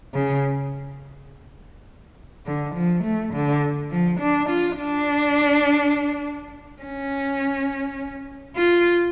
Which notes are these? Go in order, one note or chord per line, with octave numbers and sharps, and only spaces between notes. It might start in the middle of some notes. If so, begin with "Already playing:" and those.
C#3
D3
F3
A3
D3
F3
D4
F4
D4
C#4
F4